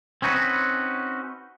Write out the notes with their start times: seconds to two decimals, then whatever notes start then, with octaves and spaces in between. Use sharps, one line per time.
0.22 C4 C#4 D#4 F#4 B4